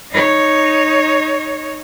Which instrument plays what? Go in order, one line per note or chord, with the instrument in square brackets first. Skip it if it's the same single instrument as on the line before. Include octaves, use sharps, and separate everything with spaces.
[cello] D#4 C#5